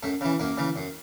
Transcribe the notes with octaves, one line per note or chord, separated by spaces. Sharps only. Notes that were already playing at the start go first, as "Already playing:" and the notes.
F#2 A3
C#3 E3
F#2 A#3
C#3 E3
F#2